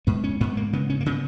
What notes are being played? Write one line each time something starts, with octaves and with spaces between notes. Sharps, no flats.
G#2 B3
C#4
G#2 B3
A#3
C#3 B3
C#4
A#3
C#3 B3